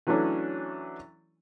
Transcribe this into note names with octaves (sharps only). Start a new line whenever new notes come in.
E3 F#3 A3 C#4 D4